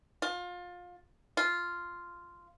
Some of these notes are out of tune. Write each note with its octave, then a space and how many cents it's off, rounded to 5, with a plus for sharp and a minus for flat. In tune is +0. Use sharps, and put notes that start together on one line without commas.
F4 +25
F4 -5